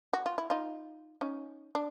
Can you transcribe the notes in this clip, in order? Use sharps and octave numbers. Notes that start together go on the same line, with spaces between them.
F#4
F4
E4
D#4 F4
C#4 D#4
D4